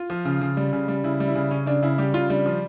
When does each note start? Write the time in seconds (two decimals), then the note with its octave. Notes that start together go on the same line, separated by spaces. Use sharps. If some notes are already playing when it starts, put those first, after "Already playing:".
Already playing: F4
0.10 F3
0.25 C#3
0.41 C#3
0.57 G3
0.73 C#3
0.88 G3
1.04 C#3 E4
1.20 G3
1.28 E4
1.35 C#3
1.51 C#3 C#4
1.66 C#3 D4
1.82 C#3 E4
1.98 G3 G4
2.14 C#3 F4
2.30 G3 D4
2.46 F3